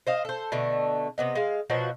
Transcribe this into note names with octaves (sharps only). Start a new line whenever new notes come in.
C5 D#5 F5
A4 C5
B2 D3 A3
C3 B3 D#5
G#3 F5
B2 F3 F#3 F#4